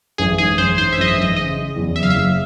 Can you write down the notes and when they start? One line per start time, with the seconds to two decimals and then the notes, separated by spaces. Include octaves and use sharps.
0.18 A1 G#4
0.38 G#2 G#4
0.58 A1 C5
0.78 G#2 C5
0.93 E5
0.98 A1 D#5
1.08 E5
1.18 A1 D#5
1.36 C#3 D#5
1.56 C#3
1.76 E2
1.96 F#1 E5
2.03 F5
2.10 F#1 E5